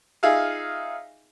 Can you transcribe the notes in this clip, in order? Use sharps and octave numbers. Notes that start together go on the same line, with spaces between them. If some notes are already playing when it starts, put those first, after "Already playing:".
D#4 F4 G#4 E5 F5